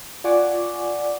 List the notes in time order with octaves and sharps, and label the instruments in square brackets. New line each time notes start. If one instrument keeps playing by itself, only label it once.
[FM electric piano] F4 D5 F#5 G#5 C#6 D6